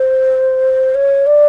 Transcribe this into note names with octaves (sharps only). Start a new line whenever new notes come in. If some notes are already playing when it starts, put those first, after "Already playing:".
Already playing: C5
C#5
D5